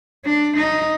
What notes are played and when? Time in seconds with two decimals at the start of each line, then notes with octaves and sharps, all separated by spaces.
0.26 D4
0.57 D#4